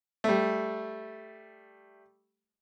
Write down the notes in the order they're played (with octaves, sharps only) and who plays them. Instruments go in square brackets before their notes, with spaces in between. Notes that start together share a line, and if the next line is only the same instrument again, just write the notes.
[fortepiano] G3 A3